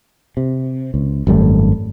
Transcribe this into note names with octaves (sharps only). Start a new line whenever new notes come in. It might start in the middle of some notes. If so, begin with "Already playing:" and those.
C3
C#2
G#1 F#2 G3 A3